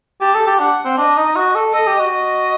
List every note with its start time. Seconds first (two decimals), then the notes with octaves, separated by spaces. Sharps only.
0.21 G4 A5
0.35 A4
0.47 G4
0.60 D4 F#5
0.85 C4
0.97 D4 D#5
1.17 D#4
1.36 F#4
1.55 A4
1.74 A4 D#5
1.87 G4
2.00 F#4
2.13 D#5